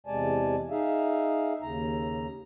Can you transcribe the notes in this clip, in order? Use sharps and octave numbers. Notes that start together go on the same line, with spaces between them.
E2 C3 G#3 D5 G#5 A5
D#4 G#4 E5 F5
D#2 C#3 A#5